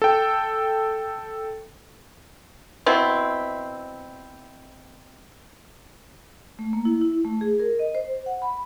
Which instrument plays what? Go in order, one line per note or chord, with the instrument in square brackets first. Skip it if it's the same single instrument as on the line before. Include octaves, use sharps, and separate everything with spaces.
[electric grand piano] A4 G5
[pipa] B2 C4 E4
[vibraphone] A3
A#3
E4
E4
A3
G#4
A#4
D#5
C5
F#5
B5